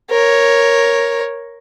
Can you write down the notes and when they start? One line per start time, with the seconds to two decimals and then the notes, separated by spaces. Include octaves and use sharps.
0.10 A#4 C#5